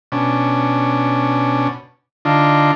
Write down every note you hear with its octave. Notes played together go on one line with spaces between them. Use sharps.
B2 C#4 D4
D3 D4 D#4 F4